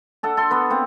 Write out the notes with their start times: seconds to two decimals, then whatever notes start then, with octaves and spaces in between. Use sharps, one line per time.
0.23 D4 A4 F#5
0.37 A4 C6
0.51 B3 B4
0.70 A#3 C4